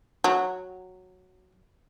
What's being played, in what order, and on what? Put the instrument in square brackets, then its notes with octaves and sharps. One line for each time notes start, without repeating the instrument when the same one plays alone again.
[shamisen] F#3